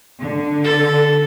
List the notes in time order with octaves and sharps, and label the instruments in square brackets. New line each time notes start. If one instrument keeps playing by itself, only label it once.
[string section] D3
[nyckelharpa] A4